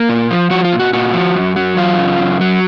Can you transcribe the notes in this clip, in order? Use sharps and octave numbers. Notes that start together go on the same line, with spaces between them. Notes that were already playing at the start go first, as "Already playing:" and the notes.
Already playing: A#3
A#2
F3
F3 F#4
F4
A#2
F#4
A#2 F#4
F3
F#2
F#3
F#2 F4
C#3
F#2
F#3